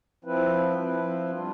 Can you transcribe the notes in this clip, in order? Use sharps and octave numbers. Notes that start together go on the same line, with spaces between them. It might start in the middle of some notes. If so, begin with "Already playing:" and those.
F3 C4 E4 B4
F3 C4 E4 B4
G3 D4 F4